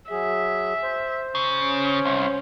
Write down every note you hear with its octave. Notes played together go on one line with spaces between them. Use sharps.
F#3 G#4 E5
C5
C#3
C#4
C2